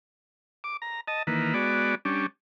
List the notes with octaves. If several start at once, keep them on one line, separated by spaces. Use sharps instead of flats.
D6
A#5
D#5 A5
D#3 E3 A#3 B4
G#3 B3 F#4 D5
G3 C#4 D4